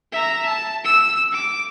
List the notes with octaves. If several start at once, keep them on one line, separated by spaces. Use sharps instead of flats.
E5 A#5
A5
E6
D6